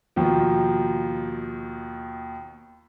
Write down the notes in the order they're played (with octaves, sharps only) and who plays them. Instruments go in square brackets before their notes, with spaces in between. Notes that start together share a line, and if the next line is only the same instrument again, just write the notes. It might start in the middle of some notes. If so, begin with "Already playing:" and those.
[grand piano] D#2 B2 D#3 F3